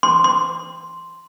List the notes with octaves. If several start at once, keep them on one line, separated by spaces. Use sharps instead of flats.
C6
C6